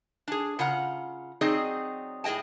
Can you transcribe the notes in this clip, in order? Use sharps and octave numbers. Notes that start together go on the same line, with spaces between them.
D4 G#4
C#3 F4 F#5 A#5
F#3 C4 D#4 G#4 D5 D#5
A2 G#4 D#5 G5 A5